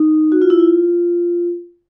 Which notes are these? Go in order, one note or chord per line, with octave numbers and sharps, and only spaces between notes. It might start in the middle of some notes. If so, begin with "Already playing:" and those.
Already playing: D#4
F#4
F4
E4
F4